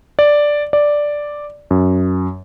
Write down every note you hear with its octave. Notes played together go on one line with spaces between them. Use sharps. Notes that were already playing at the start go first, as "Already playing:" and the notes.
D5
D5
F#2